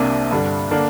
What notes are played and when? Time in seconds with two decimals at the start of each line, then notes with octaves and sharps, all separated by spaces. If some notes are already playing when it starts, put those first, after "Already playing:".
Already playing: C2 C3 A#3 D4
0.31 G2 D3 G3 D4
0.71 D3 A#3 D4